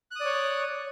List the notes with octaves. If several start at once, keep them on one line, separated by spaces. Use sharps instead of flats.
C#5 D5 D#6 F#6